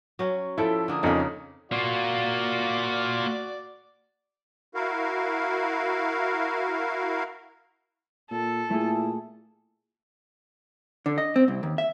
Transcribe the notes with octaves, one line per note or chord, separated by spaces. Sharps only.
F#3 C#4
F3 E4 A4 E5 G5
D3 A#3 G#4
F2 C#3 A#3 C#4 D#4
A#3 F4 F#4 D5
E4 F#4 A#4 F5
A#2 A4
A#2 A3 E4 G#4
D3
D#5
C4
C2
D#2
E5